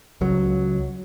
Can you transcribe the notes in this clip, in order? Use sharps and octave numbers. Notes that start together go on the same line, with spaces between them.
C#2 F#3